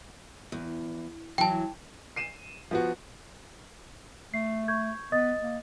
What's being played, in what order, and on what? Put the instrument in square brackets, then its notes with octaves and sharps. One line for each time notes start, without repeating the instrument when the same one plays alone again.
[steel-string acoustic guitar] E2
[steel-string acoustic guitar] E3 F#3 [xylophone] G5 A5
[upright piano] C7 D#7 E7
F3 B3 F#4
[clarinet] A3 [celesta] C7
[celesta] C#6 G6 G#6
[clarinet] B3 [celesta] D#5 D#6 A6
[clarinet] A#3